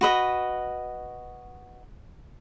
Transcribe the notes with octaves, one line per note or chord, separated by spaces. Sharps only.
F#4 B4 D#5